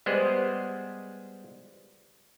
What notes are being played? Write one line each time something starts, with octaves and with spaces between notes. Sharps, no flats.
G3 G#3 B3 G#4 C5 F#5